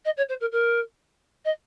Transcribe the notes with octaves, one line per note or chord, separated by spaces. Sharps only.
D#5
C#5
C5
A#4
A#4
D#5